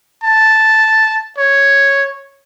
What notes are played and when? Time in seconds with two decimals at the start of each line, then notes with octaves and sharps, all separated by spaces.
0.23 A5
1.38 C#5